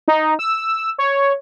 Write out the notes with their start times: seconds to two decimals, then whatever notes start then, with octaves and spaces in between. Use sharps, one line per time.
0.08 D#4
0.39 E6
0.98 C#5